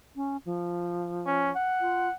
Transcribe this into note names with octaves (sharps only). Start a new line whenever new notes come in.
C#4
F3
C#4
F#5
F4